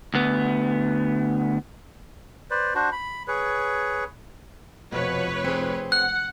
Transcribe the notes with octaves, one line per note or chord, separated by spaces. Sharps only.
D2 B3
B4 C5 D5
D4 F#4 C5
B5
G#4 B4 C#5
F1 B2 F3 B4 C#5
C4 G#4
F#5 F#6